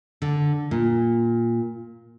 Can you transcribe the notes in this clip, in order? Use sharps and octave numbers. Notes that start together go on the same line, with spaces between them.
D3
A#2